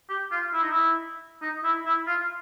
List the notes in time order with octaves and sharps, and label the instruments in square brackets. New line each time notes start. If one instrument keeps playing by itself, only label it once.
[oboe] G4
F4
E4
D#4
E4
D#4
E4
E4
F4